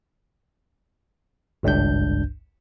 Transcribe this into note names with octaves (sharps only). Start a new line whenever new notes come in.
G#1 C#2 G2 D4 G6